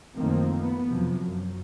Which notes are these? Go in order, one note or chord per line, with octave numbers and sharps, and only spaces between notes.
F#2 D#3 F3 A3 A#3 C4
B3
F2 C3 F3 F#3
F#2